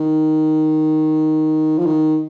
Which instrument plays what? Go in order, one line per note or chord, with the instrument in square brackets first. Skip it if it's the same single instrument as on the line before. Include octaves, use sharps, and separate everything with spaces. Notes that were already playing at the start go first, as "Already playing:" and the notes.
Already playing: [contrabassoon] D#3
F3
D#3